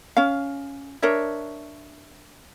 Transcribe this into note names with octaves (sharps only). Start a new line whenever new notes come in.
C#4 F5
D4 A#4 C#5 E5